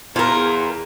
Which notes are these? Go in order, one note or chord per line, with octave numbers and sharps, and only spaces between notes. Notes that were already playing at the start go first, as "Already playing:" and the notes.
E2 F4 A#4